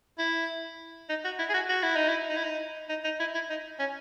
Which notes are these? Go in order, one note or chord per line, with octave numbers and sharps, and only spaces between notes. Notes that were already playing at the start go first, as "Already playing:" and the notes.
E4
D#4
F#4
E4
G#4
F#4
F#4
E4
D#4
E4
D#4
E4
D#4
D#4
D#4
E4
E4
D#4
C#4